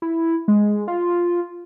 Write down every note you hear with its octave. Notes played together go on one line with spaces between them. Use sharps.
E4
G#3
F4